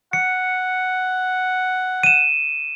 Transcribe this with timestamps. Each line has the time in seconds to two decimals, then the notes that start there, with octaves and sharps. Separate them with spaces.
0.13 F#5 C#7
2.03 D#7 E7